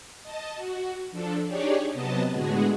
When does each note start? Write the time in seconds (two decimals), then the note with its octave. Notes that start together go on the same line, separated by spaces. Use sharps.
0.23 D#5 A5
0.56 F#4
1.11 F3 D4 A4
1.46 D4 D#4 G4 G#4 C#5 D5
1.93 C3 F#3 B3 D#5 A5
2.32 A2 D3 G#3 B3 F#4 G#4